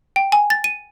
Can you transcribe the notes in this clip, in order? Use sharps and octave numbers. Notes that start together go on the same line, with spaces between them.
G5
G#5
A6
D#7